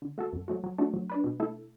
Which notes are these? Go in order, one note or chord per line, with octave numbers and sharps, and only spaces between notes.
D3
A3 F#4 A4
F#2
F#3 A3 F#4
F#3
A3 D4 F#4
F#3
D4 B4
B2
A3 E4 A4